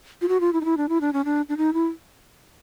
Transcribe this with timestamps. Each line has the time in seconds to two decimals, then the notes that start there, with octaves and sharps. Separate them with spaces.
0.21 F4
0.29 F#4
0.40 F4
0.53 E4
0.61 D#4
0.65 E4
0.77 D4
0.89 E4
1.01 D4
1.13 C#4
1.25 D4
1.49 D4
1.57 D#4
1.74 E4